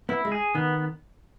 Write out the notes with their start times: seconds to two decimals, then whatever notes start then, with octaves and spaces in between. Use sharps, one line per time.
0.09 B3 E4
0.25 G#3
0.32 G#4
0.55 D#3 B3